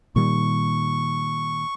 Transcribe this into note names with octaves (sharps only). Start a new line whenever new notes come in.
A#2 D#3 G3 C#6